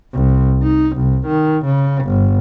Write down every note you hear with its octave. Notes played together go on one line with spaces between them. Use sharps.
C2
D#4
C2
D#3
C#3
G1